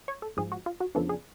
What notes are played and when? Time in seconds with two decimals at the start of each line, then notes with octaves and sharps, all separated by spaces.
0.08 C#5
0.22 A4
0.37 G#2 F3 G#3 G#4
0.52 F#4
0.66 F4
0.80 F#4
0.95 F2 C#3 F3 B3 D4 A4
1.09 G#4